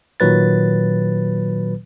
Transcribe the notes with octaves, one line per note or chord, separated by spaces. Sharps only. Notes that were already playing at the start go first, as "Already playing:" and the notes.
A#2 D#3 F#3 B4 A6